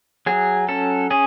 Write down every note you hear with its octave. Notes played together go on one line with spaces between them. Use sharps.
F#3 G#4
C#4 A4
C#4 G#4